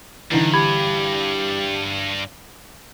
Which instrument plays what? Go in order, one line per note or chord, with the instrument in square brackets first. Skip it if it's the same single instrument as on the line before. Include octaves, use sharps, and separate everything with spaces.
[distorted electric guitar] G2 [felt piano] D3 E3 [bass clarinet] D#4
[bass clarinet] G4 [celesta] B5 G#6